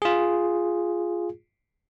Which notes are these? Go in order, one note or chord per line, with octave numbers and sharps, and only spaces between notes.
F4 G#4